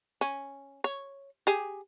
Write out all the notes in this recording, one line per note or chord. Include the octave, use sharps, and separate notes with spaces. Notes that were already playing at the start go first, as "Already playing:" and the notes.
C#4
C#5
G4 G#4